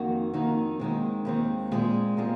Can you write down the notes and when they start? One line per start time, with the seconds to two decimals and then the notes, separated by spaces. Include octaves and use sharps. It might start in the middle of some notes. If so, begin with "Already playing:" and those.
Already playing: F2 D#3 A#3 D#4 F#4
0.34 F2 D#3 A#3 D#4 F#4
0.80 D#2 D#3 G#3 C4
1.25 D#2 D#3 G#3 C4
1.71 A#2 G#3 C4 F4 G#4
2.17 A#2 G#3 C4 F4 G#4